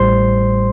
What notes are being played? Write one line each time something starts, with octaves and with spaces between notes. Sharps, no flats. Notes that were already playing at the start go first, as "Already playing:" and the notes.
Already playing: A1 A2 G3 C5 C6